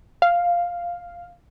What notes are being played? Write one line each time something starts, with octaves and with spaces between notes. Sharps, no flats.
F5